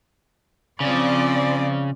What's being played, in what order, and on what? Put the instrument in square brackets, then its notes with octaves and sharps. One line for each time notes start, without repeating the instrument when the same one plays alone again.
[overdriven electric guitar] C#3 [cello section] F3 C4 D5